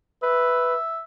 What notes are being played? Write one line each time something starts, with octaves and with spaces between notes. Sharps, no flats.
B4 E5